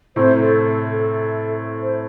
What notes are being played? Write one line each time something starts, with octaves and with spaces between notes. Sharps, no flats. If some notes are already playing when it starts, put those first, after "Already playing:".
A2 C3 C5
A4
A4
A4
C5